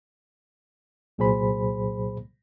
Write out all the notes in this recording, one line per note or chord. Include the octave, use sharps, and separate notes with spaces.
C2 A#2 F#3 G#4 C5 B5